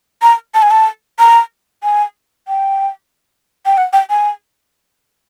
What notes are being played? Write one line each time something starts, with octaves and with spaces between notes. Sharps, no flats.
A#5
A5
G#5
A5
A#5
G#5
G5
G5
F#5
G5
G#5